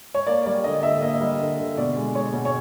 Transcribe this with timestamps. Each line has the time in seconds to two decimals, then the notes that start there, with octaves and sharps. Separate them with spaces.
0.14 C#5
0.27 A#3 D5
0.46 G3 D5
0.64 D3 D#5
0.83 D3 E5
1.02 A#3 D#5
1.21 G3
1.40 D3
1.58 D3
1.77 B2 D5
1.96 G#3
2.15 G#3 C#5
2.33 B2
2.45 C#5